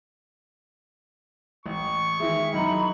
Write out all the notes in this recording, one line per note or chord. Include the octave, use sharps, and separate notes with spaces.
A1 C#6
D#3 E3 G#3 E5
F#2 D#4 B5